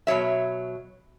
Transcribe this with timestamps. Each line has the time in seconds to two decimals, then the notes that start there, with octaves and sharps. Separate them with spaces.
0.07 B2 F#3 C#5 E5